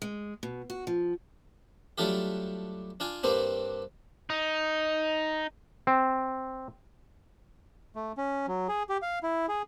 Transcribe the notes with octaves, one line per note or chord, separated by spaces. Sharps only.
G#3
B2
F#4
F3
F#3 G3 A3 D4 F4 G4
D4 F4 G#5
G2 G3 A#3 C4 D4
D#4
C4
A3
C#4
F#3
G#4
G4
F5
E4
G#4